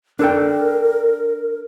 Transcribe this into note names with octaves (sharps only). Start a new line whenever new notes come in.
D4 A4 A#4 G5